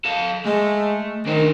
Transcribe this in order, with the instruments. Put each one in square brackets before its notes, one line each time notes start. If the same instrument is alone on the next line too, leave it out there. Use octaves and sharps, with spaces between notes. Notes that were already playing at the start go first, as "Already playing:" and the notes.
[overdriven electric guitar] A4 F5
[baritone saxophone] G#3 [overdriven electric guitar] A3
[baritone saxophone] D#3 [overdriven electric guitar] D4 C5